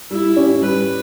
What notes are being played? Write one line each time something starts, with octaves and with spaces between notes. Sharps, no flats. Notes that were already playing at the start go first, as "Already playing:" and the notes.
G3 E4
C#4 G4
G3 B4